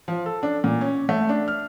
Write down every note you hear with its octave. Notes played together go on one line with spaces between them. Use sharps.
F3
A4
D4
A#2
C#4
A3
D4
F6